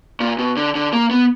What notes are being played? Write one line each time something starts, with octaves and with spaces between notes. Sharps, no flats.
A#2
B2
D3
D3
A#3
B3